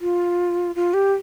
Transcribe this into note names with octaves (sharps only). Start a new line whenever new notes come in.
F4
F4
G4